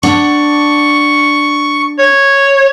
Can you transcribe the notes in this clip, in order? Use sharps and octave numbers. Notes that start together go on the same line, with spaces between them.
D4 F#5 C#6
C#5